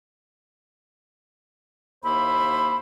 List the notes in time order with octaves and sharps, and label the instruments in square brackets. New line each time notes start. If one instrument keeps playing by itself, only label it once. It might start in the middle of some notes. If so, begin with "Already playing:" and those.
[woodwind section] D#2 A#3 E4 C5 B5